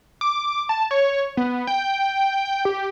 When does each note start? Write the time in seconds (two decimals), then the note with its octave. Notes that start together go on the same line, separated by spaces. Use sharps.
0.21 D6
0.69 A5
0.91 C#5
1.37 B3
1.67 G5
2.45 G5
2.65 G4